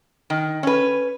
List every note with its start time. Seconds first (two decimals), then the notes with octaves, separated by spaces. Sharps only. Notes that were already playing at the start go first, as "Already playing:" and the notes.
0.30 D#3
0.63 C#4 B4